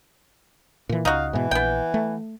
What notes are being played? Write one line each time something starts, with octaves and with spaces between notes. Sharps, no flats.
A#2 E3
C#2 D#4 F#4 F5
G#2 B2 E3
A#1 B3 G5
A3